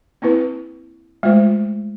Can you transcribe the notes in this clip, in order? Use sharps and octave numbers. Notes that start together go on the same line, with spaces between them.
A#3 C4 E4 B4
G#3 A3 F4 C5